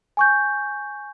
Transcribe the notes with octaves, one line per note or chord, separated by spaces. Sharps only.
G#5 C#6 G6